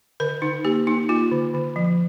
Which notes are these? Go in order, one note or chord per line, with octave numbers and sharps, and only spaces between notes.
D3 A#4
D3 D#4
A#3 G4
A#3 D#4
A#3 F4
D3
D3
F3